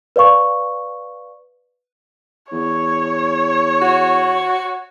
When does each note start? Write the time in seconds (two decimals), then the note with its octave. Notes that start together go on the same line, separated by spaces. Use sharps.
0.16 B4 D5 F5 C#6
2.52 E2 C#5
3.82 F#4